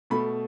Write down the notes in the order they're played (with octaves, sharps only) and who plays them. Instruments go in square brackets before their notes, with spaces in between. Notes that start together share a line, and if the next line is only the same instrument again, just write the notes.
[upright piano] B2 A3 B5